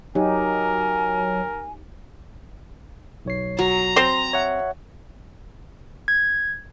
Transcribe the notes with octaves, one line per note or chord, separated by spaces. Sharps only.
F#3 D#4 G4 A#4 G#5
B1 C#5 C7
F#3 A#5
C4 C5 C6
C#5 E5 F#5
G#6